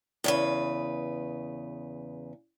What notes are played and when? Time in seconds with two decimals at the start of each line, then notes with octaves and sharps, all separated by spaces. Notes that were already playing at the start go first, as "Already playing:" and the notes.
0.24 E2 C#3 B4